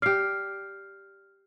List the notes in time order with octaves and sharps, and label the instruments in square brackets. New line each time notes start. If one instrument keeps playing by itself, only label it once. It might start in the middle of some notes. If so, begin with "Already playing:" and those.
[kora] G4 D5 [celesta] F6 C7